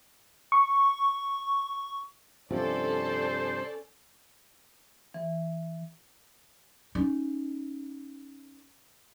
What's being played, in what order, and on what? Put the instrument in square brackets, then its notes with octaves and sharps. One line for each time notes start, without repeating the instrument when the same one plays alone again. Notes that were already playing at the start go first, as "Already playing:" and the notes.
[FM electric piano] C#6
[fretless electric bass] G2 C3 F3 [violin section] C#4 A4 D5 [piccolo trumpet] C5
[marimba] E3
[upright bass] C#4 D#4